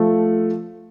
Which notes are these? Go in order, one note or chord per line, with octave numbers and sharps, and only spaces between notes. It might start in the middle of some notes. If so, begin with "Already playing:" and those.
Already playing: F3 A3